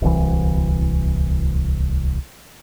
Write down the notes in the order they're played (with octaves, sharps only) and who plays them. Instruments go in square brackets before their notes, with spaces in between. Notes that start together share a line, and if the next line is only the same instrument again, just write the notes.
[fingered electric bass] D1 C2 E3